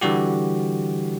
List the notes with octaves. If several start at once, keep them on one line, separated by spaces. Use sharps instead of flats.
D3 E3 G3 F#4 G4